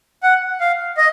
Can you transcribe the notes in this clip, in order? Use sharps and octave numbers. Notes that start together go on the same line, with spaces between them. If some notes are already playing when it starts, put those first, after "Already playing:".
F#5
F5
D#5